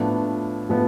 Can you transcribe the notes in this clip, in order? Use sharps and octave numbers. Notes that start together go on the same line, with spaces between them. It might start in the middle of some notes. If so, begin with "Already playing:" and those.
Already playing: A2 F3 B3 D4
A2 F3 B3